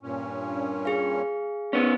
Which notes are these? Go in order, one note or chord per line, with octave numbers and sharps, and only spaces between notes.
G2 A#2 C#4
G#4 F5
A2 B3 C#4